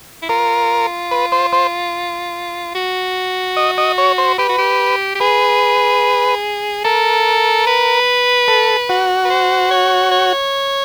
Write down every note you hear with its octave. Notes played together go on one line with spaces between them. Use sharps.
E4
F4 A#4
B4
C5
C5
F#4
D#5
D#5
C#5
C5
G4 B4
F#4
G4
G4
G#4 B4
A4 A#4
B4
A4
F#4
B4
C5
C#5
C#5